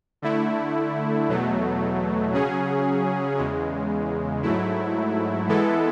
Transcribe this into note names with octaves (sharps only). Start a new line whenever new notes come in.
D3 A3 E4
E2 B2 F#3 A3
C#3 F#3 C#4 G#4
E2 C#3 G#3
G#2 F#3 A3 E4
E3 G#3 B3 E4 A4